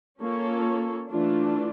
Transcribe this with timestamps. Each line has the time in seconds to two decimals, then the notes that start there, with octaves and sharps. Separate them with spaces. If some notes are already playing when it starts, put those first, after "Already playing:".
0.20 A#3 C#4 F4 A4 C#5
1.09 E3 A3 D4 F4